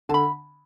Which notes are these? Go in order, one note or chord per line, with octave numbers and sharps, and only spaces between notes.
D3 A5
B5